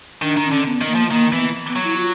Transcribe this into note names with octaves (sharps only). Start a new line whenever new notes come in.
D#3 D4
D#3
C#4
D3
B3
D#3
A#3
F3
D#3 A#3
E3 B3
B3
F#3
E4
F4